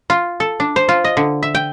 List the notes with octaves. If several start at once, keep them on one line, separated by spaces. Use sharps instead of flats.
F4
A4
D4
C5
F4
D#5
D3
E5
G5